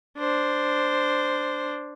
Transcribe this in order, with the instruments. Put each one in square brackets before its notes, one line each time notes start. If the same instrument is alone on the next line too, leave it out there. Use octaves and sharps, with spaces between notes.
[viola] D4 C5